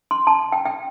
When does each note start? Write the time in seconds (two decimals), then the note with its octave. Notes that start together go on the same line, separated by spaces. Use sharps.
0.11 C6
0.27 A5
0.52 G5
0.66 G5